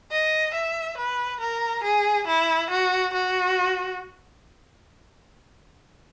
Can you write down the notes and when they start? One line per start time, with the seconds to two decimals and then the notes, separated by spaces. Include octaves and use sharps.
0.11 D#5
0.54 E5
0.98 B4
1.41 A#4
1.84 G#4
2.27 E4
2.70 F#4
3.14 F#4